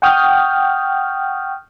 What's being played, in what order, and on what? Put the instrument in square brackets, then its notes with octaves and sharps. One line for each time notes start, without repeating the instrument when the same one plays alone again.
[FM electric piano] F#5 G5 C#6 D#6 F6 G6